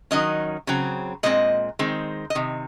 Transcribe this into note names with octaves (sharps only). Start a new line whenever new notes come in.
D#3 F#3 C#4 D#5
C#3 F#3 C4
A#2 G#3 C4 D#5
D#3 G#3 C4
D#5
C3 D#3